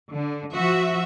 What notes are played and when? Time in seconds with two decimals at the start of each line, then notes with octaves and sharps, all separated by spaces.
0.11 D3
0.53 F3 F#4 E5